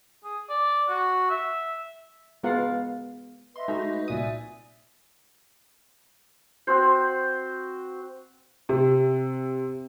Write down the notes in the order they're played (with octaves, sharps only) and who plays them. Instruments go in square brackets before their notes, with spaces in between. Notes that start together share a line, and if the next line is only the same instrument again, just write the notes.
[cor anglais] G#4
D5
F#4
E5
[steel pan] G#3 B3 F4 A#4 F5 F#5
[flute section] B4 D#5 E5 [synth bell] C6
[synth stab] G#3 A3 [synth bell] D#4 F#4
[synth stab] C2 A#2 D#6 [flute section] D5 E5 G#5
[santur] C4 F#4 C5
[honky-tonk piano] C3